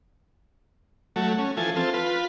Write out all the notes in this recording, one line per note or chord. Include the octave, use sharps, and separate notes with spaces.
F#3 A3
C#4
E3 F3 A4 G#5
C4 F4 A4
F4 B4